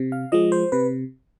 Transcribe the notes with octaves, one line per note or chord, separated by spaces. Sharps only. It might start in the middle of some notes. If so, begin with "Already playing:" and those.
Already playing: C3
F5
F3 G#3 D#5
C5
C3 B4